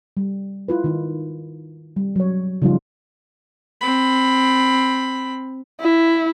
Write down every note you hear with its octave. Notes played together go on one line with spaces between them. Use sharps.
G3
E4 F4 B4
D#3 D#4
G3
F#3 C#5
C#3 F3 G3 C#4 D#4 F4
C4 B5
E4